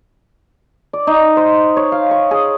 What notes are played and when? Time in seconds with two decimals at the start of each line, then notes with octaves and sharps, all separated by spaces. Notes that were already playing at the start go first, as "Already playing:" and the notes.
0.93 D5
1.07 D#4
1.37 C5
1.77 C#5
1.92 F5
2.11 C#6
2.31 G#4